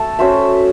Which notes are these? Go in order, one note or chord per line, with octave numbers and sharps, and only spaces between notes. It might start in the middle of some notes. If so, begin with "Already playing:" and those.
Already playing: A3 A4
C#4 F#4 C5 E5